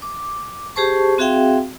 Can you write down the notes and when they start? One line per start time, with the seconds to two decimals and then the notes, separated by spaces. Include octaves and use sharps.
0.02 D6
0.76 G4 G#4 C5 A5 C#6
1.18 C4 F#4 G#4 E5 F5 G5